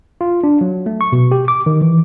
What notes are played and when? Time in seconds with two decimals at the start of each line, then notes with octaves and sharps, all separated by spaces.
0.21 F4
0.44 D4
0.61 F#3
0.86 A3
1.01 C#6
1.12 B2
1.32 G4
1.48 D6
1.66 D#3
1.81 E3